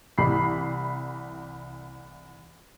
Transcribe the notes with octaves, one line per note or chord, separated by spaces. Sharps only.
C2 E3 B5 C7